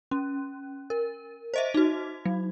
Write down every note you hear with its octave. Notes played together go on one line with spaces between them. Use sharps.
C#4
A#4
C5 D#5 E5
D#4 F#4
F#3